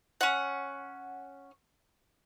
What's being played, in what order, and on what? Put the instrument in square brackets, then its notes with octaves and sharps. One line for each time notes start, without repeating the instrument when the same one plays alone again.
[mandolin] C#4 F#5